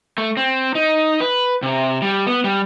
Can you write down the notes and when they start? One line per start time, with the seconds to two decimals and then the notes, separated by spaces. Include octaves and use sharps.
0.18 A3
0.37 C4
0.75 D#4
1.20 B4
1.63 C3
2.02 G3
2.27 B3
2.44 G3